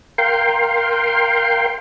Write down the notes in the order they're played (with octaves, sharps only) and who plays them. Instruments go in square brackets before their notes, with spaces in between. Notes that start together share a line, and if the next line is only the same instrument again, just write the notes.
[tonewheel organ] A#4 F5 G5 C6